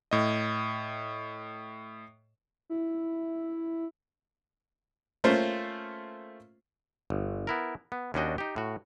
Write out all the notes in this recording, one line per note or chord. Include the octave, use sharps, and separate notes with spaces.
A2 D#5
E4
A3 A#3 C#4 F4 C5
G1
B3 E4 A#4
B3
D#2 C#4 D4 F#4 D#5 G5
D#4 G4
A2 F#4